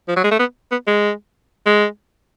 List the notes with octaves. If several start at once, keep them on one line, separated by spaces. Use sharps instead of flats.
F3
F#3
G#3
A3
B3
B3
G#3
G#3